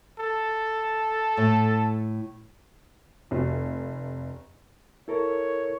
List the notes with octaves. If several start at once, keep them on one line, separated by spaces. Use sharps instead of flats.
A4
A2
F1
E4 A4 A#4 C#5